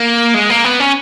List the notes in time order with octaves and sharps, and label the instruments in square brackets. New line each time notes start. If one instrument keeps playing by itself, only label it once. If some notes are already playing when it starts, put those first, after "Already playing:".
Already playing: [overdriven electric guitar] A#3
G#3
A#3
B3
C#4